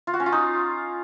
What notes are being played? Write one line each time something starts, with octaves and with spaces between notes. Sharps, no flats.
F4
F#4
C#4
F4
D#4